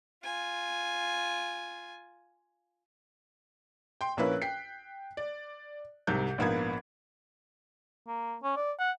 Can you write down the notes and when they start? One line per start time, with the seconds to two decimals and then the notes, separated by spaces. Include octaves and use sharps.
0.24 F4 G#5
4.01 G5 C6
4.17 A#1 A#3 C#4 E4 B4 F#6
4.42 G5 B6 C7
5.17 D5
6.07 C2 G#2 C3 G6
6.38 A#1 G#2 A#3 B3 B5 G#6
8.07 A#3
8.43 C#4
8.56 D5
8.79 F#5